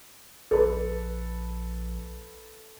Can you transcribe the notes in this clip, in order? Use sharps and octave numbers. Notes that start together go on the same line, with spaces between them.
A#1 A4 B4